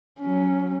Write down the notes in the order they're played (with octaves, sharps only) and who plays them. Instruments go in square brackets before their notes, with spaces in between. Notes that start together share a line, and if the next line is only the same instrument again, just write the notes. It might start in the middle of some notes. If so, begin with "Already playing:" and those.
[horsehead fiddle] F#3 C#4